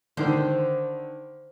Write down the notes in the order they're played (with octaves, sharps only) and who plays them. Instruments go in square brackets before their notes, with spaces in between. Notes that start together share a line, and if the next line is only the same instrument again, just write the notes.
[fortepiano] D3 D#3 [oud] C5